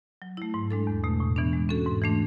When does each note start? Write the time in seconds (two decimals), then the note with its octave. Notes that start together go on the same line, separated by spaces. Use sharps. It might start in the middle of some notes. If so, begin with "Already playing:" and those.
0.22 F#3
0.37 A3 E4
0.54 G#2
0.71 G#3 D4 A4
0.87 E2
1.04 B2 A3
1.20 A2
1.36 E3 B3 D4
1.53 G#3
1.69 C#4 F#4 A4
1.86 G#2
2.02 E3 A3 D4